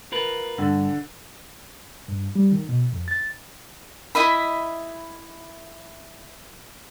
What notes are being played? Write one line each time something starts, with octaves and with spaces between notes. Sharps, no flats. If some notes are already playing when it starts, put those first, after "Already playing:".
F4 A#4 B4
G2 D3
G2
G3
D#3
B2
F2
A6
E4 D#5 E5 B5